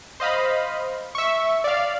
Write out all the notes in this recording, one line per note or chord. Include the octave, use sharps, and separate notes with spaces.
C5 D#5 F5 B5
E5 C#6
D5 F5